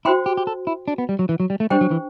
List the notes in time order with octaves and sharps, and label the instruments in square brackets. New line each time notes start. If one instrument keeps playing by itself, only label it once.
[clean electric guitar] E4 [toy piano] F#4 C5 G5 C6
[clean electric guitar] G4
G4
A4
E4
D4
B3
G3
F#3
E3
F#3
G3
A3
[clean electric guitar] G3 [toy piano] D4 G4 C5 G5
[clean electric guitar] F#3
E3